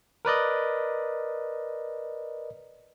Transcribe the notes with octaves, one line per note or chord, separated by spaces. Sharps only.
A#4 B4 D5 D#5